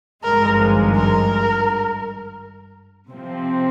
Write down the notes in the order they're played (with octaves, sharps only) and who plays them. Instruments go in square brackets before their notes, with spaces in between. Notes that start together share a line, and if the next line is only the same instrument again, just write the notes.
[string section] G#1 G2 F3 G#3 [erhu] A#4
[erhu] A#4
[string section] C3 F3 C4